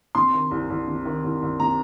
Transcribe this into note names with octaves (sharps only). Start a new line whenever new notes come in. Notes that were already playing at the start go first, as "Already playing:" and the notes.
C3 C6
D#3
C2
C2
C3
D#3
C2
C2
C3 A#5